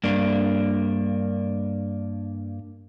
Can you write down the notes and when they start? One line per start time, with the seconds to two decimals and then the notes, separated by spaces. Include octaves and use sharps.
0.04 G2 A#3 D4